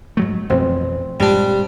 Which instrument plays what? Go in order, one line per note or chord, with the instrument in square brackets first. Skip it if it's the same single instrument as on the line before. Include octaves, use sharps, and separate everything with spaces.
[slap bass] G#2 F#3 A3
[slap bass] A1 F2 B2 [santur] C4
[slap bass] G2 A#2 G#3 [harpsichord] G3 D4